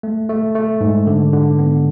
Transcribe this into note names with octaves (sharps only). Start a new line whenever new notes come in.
A3
A3
A3
G#2
D3
D3
B3